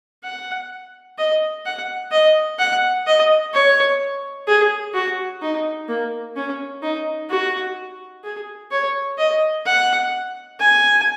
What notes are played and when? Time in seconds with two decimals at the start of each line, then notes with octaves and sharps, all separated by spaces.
0.24 F#5
1.18 D#5
1.65 F#5
2.12 D#5
2.59 F#5
3.07 D#5
3.54 C#5
4.48 G#4
4.94 F#4
5.42 D#4
5.88 A#3
6.36 C#4
6.83 D#4
7.30 F#4
8.24 G#4
8.71 C#5
9.18 D#5
9.66 F#5
10.60 G#5